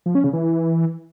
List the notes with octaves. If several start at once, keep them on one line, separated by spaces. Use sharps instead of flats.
F3
C#4
C#3
E3